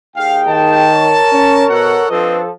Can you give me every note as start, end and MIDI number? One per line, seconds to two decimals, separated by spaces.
0.17 0.88 39
0.17 0.88 68
0.17 0.38 77
0.17 0.88 79
0.48 1.22 51
0.48 1.64 81
0.94 2.08 70
0.94 2.08 73
1.32 1.64 61
1.70 1.99 47
1.70 2.06 69
1.70 2.06 78
2.09 2.50 53
2.09 2.39 60
2.09 2.39 62
2.09 2.50 69
2.09 2.39 71
2.09 2.39 75